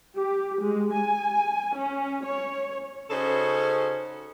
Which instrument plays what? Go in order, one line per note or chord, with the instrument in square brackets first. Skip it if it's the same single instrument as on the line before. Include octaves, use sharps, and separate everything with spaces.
[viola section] G4
G#3
G#5
C#4
C#5
[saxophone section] C#3 C#4 D#4 F#4 A4 C5